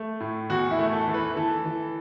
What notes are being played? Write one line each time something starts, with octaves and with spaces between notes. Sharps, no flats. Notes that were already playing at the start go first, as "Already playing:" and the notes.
Already playing: A3
A2
E2 F#4
E4
A3
A4
E3
B4
E3 A4
E3